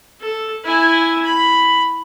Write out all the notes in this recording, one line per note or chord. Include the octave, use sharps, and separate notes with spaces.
A4
E4 G#5
B5